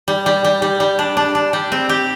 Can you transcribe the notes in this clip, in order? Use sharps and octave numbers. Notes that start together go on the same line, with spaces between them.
G3
G3
G3
G3
G3
D4
D4
D4
G3
C4
G4